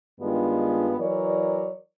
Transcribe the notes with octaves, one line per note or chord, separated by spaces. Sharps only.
G2 D#3 G#3 B3 D4 F4
E3 F#3 A#4 C#5 D5